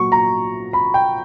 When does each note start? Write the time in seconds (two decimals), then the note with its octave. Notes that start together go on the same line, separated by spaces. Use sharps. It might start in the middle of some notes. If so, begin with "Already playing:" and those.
Already playing: A#2 F#3 C#6
0.12 A#5
0.73 B5
0.94 G5